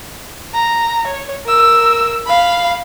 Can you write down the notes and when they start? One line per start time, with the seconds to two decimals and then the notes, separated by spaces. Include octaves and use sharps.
0.54 A#5
1.07 C#5
1.46 A#4 E6
2.26 F5 B5